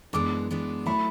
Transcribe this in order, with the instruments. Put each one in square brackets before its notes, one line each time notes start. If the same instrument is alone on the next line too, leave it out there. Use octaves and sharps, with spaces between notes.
[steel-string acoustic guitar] F#2 E3 G#3 B3 D4 [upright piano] D6
[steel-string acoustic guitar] F#2 E3 G#3 B3 D4
[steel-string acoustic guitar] F#3 A3 E4 [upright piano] B5